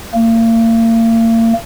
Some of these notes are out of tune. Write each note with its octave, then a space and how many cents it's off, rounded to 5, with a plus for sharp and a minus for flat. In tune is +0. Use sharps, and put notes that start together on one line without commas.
A#3 -40